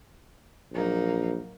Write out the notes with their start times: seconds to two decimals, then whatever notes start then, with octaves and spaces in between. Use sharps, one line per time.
0.73 A#1 F#3 A#3 D#4